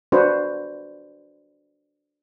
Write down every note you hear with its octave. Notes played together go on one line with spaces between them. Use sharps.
D4 F#4 B4 C5